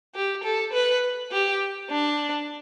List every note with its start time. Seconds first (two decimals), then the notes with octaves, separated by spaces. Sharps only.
0.15 G4
0.43 A4
0.73 B4
1.32 G4
1.91 D4